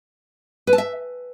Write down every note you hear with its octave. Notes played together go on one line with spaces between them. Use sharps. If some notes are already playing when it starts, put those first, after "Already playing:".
B4
A5
E5